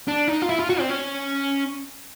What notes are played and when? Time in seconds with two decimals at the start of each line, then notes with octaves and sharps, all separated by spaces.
0.08 D4
0.28 D#4
0.42 F4
0.49 E4
0.59 F4
0.70 F#4
0.80 C4
0.89 C#4